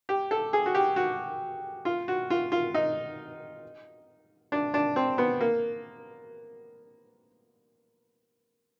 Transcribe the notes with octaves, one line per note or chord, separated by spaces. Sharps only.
G4
A4
G#4
F#4
G4
F#4
F4
F#4
F4
F4
D#4
D4
D4
C4
B3
A#3